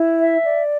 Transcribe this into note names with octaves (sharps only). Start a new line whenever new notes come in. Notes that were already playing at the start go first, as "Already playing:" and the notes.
Already playing: E4
E5
D5